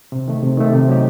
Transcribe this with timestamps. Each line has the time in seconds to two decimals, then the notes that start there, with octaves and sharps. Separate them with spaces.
0.12 C3
0.28 D#3 A3
0.43 C3
0.57 D#3 A3
0.72 C3
0.88 F#3 A3 D#4 G4